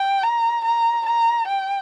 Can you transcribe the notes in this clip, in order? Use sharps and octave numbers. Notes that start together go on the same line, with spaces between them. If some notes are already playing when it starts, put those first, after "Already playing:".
Already playing: G5
A#5
A#5
A#5
G5